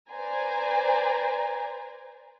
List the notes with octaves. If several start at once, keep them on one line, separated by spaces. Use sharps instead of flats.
B4 C5 D5 G#5 A#5